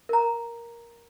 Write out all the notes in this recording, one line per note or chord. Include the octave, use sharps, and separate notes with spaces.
A#4 A#5